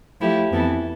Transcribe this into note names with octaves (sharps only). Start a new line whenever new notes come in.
F3 A3 E4 G4
F2 E3 B3 E4 A4